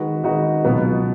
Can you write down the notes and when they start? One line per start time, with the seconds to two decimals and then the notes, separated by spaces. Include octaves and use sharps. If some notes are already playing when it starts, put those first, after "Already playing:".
Already playing: D#3 G#3 D#4 F#4 B4
0.24 D#3 G#3 D#4 F#4 B4
0.64 C#2 B2 F#3 B3